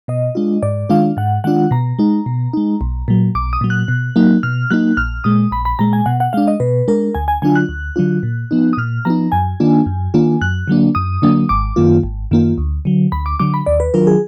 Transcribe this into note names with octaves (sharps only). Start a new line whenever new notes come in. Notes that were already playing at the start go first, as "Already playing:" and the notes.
B2 D#5
G#3 D4 F4
G#2 D5
D#3 G#3 D4 F4 F5
G#2 F#5
D#3 G#3 D4 F4 F#5
B2 A#5
G#3 D#4
B2
G#3 D#4
B1
A#2 F#3
B1 D6
D#6
A#2 F#3
F#6
B2
F#3 A#3 D#4
B2 F6
F#3 A#3 D#4 F#6
A#1 F6
A#2 G#3 D#6
A#1 B5
B5
A#2 G#3 A#5
G#5
B2 F#5
F#5
G#3 D4 F5
D#5
B2 B4
G#3 D4 A#4
D2 G#5
G#5
D3 F#3 D4 F4 G#5
F#6
D2
D3 F#3 D4 F4
A#2
F3 B3 D#4
D#6
A#2 F6
F3 B3 D#4 A#5
F#2 G#5
D#3 A#3 D4 F4
F#2
D#3 A#3 D4 F4
F#2 F#6
D3 F#3 A#3 D4
F#2 D#6
D3 F#3 A#3 D4
G#1 D6
F#2 D#3 A#3 F4
G#1
F#2 D#3 A#3 F4
D2
D3 F#3
D2 B5
D6
D3 F#3 D6
B5
D#2 D5
B4
D#3 F#3 D4 F4 A#4
G#4